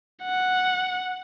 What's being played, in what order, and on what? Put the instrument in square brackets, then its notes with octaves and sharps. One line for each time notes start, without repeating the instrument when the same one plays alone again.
[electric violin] F#5